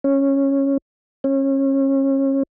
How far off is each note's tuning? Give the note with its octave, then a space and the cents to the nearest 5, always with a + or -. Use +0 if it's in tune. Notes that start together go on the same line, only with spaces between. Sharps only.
C#4 -10
C#4 -30